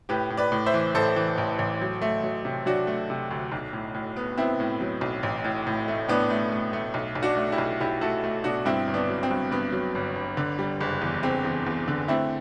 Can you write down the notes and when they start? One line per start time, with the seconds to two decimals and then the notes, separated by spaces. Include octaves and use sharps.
0.09 A2 G4 B4
0.30 A2
0.37 B4 D5
0.52 A2
0.66 C5 E5
0.74 E3
0.95 A1 A4 C5
1.16 E3
1.38 A1
1.59 A1
1.81 F#3
2.02 A3
2.23 F#3
2.45 C3
2.66 F#3 D4 F#4
2.87 A3
3.10 C3
3.31 D2
3.52 B1
3.73 A2
3.94 A2
4.16 B3
4.38 B3 C4 E4
4.60 A2
4.81 F#3
5.01 B1
5.23 A1
5.44 A2
5.67 A2
5.88 A3
6.08 A2 B3 D4
6.30 A3
6.52 A3
6.73 A3
6.94 B1
7.15 B1
7.23 D4 F#4
7.37 A3
7.52 E4 G4
7.58 B1
7.80 B1 E4 G4
8.01 A3 F#4 A4
8.24 A3
8.44 B2 D4 F#4
8.65 G2 C4 E4
8.87 G1
8.94 B3 D4
9.09 F#3
9.23 C4
9.31 G2
9.51 G2 B3
9.72 F#3
9.95 G1
10.16 G1
10.37 D3
10.59 G3
10.81 F#1
11.01 E2
11.23 F#1 C4
11.45 E2
11.66 E2
11.88 D3
12.08 A3 C4 E4